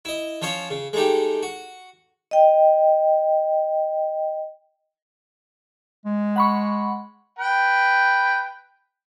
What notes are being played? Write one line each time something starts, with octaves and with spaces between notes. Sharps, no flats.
E4 D#5
F3 C#4 C#5 F5
C#3
G#3 A3 D#4 G4
F#4
D#5 G5
G#3
F#5 B5 C#6
B4 G5